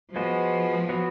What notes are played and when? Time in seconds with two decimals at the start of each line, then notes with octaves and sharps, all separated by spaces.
0.16 F3 G#3 B3 F#4
0.89 F#3 B3 F#4 C#5